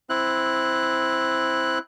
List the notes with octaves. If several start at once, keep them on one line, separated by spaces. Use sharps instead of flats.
C4 E4 F#6